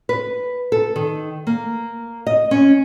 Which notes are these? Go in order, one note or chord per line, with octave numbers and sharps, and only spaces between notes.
B4
A4
D#3
A#3
D#5
C#4